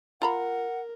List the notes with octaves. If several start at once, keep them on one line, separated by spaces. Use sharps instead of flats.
F4 A#4 F#5 A#5 B5